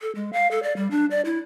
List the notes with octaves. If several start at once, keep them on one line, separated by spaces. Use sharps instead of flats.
A4
G#3
F5
A4
D5
G3
D4
D5
E4